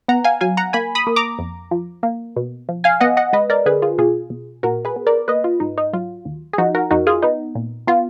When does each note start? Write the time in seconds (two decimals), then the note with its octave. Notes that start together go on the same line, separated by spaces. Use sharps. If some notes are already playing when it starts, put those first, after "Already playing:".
0.08 B3 F#5 A#5
0.24 F5 G#5
0.41 F#3 F5 G#5
0.57 F#5 A#5
0.73 A#3 G#5 B5
0.95 B5 D#6
1.07 A#3
1.16 A#5 D6
1.39 F2
1.71 F3
2.03 A#3
2.36 B2
2.69 F3
2.84 F5 G#5
3.01 B3 D#5 F#5
3.17 D#5 F#5
3.33 G#3 B4 D#5
3.50 A#4 D5
3.66 D3 G#4 B4
3.82 F4 G#4
3.98 B2 F4 G#4
4.30 B2
4.63 A#2 F#4 A#4
4.85 G#4 B4
4.96 B3
5.07 A#4 D5
5.28 A#3 B4 D#5
5.44 F4
5.60 G#2 D#4
5.78 D#4
5.93 F#3 F4
6.25 D#2
6.53 G#4
6.58 F3 D#4 F#4
6.75 F#4 A#4
6.91 F2 D#4 F#4
7.07 F4 G#4
7.22 B3 D#4
7.55 A#2
7.87 B3 F4